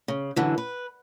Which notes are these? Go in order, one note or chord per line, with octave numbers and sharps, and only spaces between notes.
C#3
F#2 D3 E3
B4